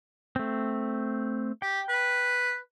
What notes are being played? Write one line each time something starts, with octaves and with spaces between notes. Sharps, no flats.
A3 C4
G4 G5
B4